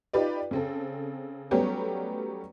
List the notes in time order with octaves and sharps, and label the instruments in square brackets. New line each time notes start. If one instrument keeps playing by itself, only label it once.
[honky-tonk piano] D#4 F4 G4 B4 D5
C#3 C4 A4
F#3 G3 A3 B3 C#4 G4